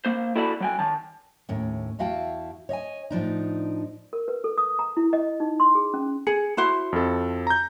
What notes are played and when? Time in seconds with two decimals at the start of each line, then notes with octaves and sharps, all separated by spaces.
0.05 A#3 C5
0.36 E4 F#4 A4 D5 A5 B5
0.61 F#3 G5 G#5
0.79 D#3 A5
1.49 D#2 A2 C#4
1.99 E2 E4 F#4 F5 G5 A5
2.69 C#5 D#5 F5 G#5
3.10 A2 F3 D4 D#4
4.13 A#4
4.28 B4
4.44 A4
4.58 D#6
4.79 A#5
4.97 E4
5.13 D#5
5.40 D#4
5.60 C6
5.75 G#4
5.94 C#4
6.27 G#4 C#7
6.57 E4 F#4 C5
6.93 F2 A4
7.47 A#5 G6